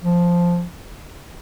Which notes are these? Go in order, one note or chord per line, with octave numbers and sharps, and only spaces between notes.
F3